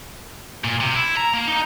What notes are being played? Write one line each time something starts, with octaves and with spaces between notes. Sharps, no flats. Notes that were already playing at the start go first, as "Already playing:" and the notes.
A#2
C3
E4
A#5
A#3
D#4